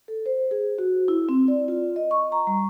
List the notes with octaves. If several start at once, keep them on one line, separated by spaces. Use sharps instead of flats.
A4
C5
G#4
F#4
E4
C4
D5
F4
D#5
C#6
A#5
G3